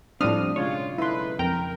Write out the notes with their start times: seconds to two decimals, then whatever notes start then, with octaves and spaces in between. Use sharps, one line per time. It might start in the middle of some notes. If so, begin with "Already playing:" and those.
0.21 A2 F3 G3 C4 D4 F4 D#6 F6
0.56 B1 C#3 G#3 F4 C#5
0.98 A3 D#4 E4 B4 C6
1.39 F2 A#4 G5 A#5